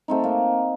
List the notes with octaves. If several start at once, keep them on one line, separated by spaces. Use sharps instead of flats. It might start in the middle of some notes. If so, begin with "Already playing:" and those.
A3 C4 D#4
A#3